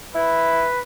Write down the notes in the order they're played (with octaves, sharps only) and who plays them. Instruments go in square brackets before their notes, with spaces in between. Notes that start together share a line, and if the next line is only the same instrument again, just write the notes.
[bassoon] E4 [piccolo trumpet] B4